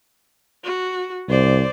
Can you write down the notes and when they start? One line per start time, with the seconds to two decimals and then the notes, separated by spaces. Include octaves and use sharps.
0.64 F#4
1.29 C2 C5 D5